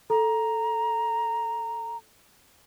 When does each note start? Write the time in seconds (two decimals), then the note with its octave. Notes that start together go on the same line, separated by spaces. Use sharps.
0.10 A4 A#5